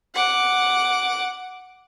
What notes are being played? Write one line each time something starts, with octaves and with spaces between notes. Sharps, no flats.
F#5 D6